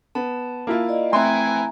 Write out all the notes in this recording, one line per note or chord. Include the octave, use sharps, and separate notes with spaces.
B3 A5
A#3 E4 F4
D5 D#5
A3 C4 E4 E5 G#5 A#5 C6